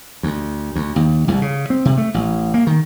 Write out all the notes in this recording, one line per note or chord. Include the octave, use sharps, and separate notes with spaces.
D2
D2
D#2
C2
C#3
C4
C3
A3
A1
A#3
D#3